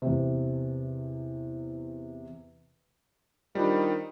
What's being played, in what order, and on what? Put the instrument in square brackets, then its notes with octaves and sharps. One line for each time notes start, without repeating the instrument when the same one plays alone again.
[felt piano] E2 C3
[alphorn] D#3 [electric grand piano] G3 D4 [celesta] F4 C5 B5